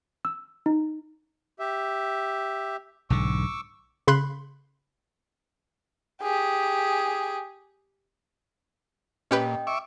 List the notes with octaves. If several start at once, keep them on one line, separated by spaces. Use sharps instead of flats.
E6
D#4
G4 E5
B1 G#2 D3 C#6 D6 E6
C#3 B5 C6 F#6
G4 G#4
A#2 C#4 G4 B4 D#5 G5
E5 C#6 D6